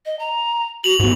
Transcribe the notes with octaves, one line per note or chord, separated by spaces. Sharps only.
D#5
A#5
F#4 F7 F#7
G#2 B3 F#4